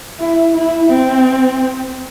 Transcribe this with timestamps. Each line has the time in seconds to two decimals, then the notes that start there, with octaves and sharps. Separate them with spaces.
0.19 E4
0.54 E4
0.89 C4